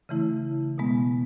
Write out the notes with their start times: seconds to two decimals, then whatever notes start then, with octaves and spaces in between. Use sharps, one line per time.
0.09 C#3 E3 A3 E4
0.78 B2 G#3 B3